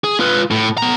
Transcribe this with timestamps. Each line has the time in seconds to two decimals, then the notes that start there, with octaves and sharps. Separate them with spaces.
0.04 G#4
0.20 F4 B4
0.51 A2
0.78 B3 A#5